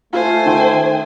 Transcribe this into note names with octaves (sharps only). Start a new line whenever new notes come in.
A3 F4 C5 G#5
D#3 G5